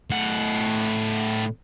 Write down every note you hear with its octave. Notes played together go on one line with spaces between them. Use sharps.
A2 F#5